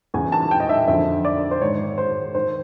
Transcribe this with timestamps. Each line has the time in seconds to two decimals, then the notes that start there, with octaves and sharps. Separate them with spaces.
0.14 E2 C#3 E3 G#5
0.32 A5
0.51 G5
0.60 D#5
0.69 E5
0.88 F2 D3 F3 E5
1.25 D5
1.51 C5
1.61 G#2 D#3 C#5
1.98 C5
2.35 D#3 C5